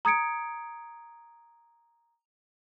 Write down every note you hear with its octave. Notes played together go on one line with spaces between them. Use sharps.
A#5 D#6 G#6 C#7 D7